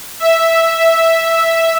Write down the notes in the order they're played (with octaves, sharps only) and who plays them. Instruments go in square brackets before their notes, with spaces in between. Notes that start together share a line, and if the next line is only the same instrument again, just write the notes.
[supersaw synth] E5